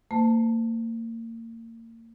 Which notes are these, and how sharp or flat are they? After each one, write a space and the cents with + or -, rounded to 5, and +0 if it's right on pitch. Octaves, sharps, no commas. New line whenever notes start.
A#3 -35 C5 -35 A5 +0